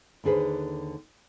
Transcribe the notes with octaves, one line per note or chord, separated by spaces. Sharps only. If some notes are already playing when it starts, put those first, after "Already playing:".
D#2 D3 G#4 B4 C5